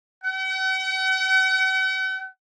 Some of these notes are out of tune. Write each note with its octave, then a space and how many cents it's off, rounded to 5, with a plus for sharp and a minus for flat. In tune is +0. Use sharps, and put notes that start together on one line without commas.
F#5 +45